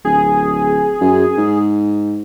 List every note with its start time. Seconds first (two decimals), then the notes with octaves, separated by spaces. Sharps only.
0.05 D1 G#4
1.01 F#2
1.37 G#2